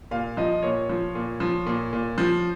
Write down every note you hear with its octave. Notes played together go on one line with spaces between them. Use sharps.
A#2 F5
F3 D#5
A#2 C#5
F3
A#2
F3
A#2
A#2
F3